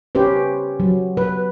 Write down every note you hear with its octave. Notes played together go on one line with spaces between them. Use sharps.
C#4 G4 B4 C5
F#3
B4